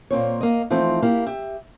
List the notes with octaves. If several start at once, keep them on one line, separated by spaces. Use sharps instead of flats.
A#2 A#3 C4 C#5
A#3 D#5
E3 F3 A3 C4 D#4
A#3 E4 G4
G4 E5